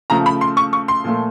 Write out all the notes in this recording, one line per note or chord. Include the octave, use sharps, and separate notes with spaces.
C#3 F3 A3 A#5
B5
C6
C#6
C#6
C6
A#2 F3 A3